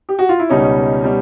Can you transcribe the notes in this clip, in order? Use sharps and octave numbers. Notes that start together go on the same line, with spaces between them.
G4
F#4
F4
E4
C#2 B2 G3 C#4 D#4
B2 G3